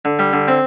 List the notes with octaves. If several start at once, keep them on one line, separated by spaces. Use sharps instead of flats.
D3
G3
D3
C4